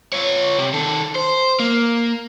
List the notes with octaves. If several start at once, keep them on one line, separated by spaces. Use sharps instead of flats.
F4 C#5
C3
D#3 A4
C5
A#3